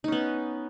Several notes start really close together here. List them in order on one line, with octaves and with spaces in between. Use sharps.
D#4 C#4 B3